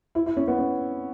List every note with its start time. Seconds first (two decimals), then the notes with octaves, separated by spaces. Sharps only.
0.15 E4
0.26 E4
0.37 C#4
0.48 B3
0.59 C#4